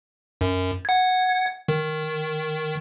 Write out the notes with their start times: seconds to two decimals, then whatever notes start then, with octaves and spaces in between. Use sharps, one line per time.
0.41 F#2
0.85 F#5 G#6
1.68 D#3